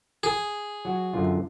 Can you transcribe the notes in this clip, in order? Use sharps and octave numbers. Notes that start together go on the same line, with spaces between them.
G#4
F#3 F#4
F#2 D3 F4